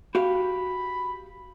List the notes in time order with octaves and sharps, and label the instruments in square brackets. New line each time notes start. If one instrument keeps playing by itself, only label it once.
[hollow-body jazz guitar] F#4 G4 F5 [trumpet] B5